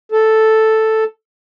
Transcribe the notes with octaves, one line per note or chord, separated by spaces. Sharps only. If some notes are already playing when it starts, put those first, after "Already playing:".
A4